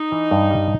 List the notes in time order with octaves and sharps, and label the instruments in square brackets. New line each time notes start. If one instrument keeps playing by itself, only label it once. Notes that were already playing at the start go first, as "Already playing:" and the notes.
Already playing: [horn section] D#4
[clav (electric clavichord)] E3
G2
G3